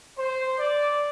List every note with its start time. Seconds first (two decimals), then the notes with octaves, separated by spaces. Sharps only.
0.17 C5
0.58 D5